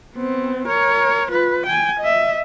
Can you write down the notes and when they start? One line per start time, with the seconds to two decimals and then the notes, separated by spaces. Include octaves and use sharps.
0.14 B3 C4
0.68 A#4 C#5
1.31 F4 B4
1.66 G5 G#5
2.00 D#5 E5